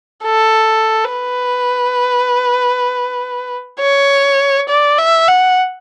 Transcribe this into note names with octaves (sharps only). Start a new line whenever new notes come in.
A4
B4
C#5
D5
E5
F#5